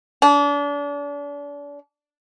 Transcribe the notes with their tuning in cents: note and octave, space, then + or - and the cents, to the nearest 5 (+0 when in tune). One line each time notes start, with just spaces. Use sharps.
D4 -35